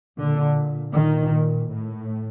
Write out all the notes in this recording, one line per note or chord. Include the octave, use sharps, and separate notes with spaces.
A#2 D3
A#2 D#3
A2